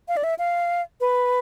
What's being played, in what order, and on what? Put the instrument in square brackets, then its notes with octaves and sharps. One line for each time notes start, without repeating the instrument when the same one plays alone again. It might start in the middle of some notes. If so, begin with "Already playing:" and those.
[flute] F5
D5
E5
F5
B4